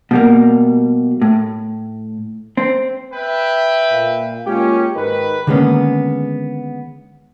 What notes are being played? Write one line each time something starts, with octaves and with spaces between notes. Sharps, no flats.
B2 G3 A#3
A2
C4
B4 E5 G5
A#2 F5
G#3 A#3 C#4 F4 G4
G#2 D#3 B4
D3 D#3 G#3 A#3 B3 C#4